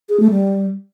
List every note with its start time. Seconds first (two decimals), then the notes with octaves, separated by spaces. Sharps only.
0.09 G#4
0.20 A3
0.30 G3